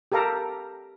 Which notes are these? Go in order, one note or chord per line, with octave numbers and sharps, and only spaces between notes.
G4 A4 A#4 F5 A#5